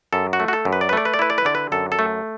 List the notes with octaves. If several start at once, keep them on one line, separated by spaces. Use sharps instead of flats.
F#2 A4
F#4
A3
F#4
A4
F#2
B4
D5
B4
A3 D5
B4
D5
E4 B4
D5
B4
D3 D5
B4
F#2 A4
A4
A3